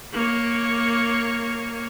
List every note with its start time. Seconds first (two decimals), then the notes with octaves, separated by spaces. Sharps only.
0.13 A#3 C#5